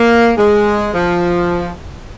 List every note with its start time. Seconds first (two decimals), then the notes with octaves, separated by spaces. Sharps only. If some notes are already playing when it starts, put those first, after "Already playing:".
Already playing: A#3
0.38 G#3
0.93 F3